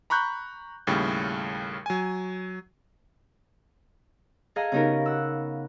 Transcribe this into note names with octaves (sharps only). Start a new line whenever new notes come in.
A#5 B5 C#6 F#6 G6
D#2 A2 C#3 G3
F#3 G#5
G#4 A4 D#5 F5 G#5 A#5
C#3 B3 D#4 G4 A#4
F#5 E6